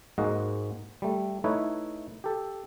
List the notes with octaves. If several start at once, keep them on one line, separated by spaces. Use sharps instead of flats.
G#2 G#3 A#3 F#4 D#5
G3 A3
A3 D#4 E4 B4 C#5
G4 A4